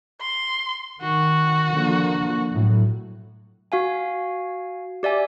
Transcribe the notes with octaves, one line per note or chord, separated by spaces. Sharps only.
C6
D#3 F#4
D3 F3 A#3
A2 F#3
F#4 F5 G#5
G4 D5 E5 G#5